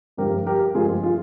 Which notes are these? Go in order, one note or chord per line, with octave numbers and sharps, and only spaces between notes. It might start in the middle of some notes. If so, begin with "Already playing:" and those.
G2 F3 G#3 G4 A#4
G4 A#4
G2 F3 G#3 F4 G#4
F4 G#4